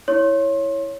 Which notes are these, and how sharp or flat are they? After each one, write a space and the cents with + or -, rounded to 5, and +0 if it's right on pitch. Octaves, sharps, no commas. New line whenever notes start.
E4 +0 C#5 +0 C6 +30